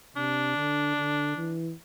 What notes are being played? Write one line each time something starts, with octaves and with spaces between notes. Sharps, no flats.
C3 D4
D3
D3
E3